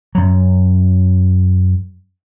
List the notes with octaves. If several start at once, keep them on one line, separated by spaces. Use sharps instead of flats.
F#2 F#3